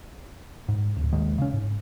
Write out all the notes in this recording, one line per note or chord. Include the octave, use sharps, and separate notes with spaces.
G#2
D1
A#1 D#2 D#3 G#3
C#3 C#4
G#2